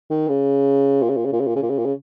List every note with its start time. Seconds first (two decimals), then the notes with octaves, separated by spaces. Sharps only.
0.10 D#3
0.28 C#3
1.03 A#2
1.09 C#3
1.17 A#2
1.25 C#3
1.33 A#2
1.40 C#3
1.47 A#2
1.56 C#3
1.63 A#2
1.70 C#3
1.79 A#2
1.85 C#3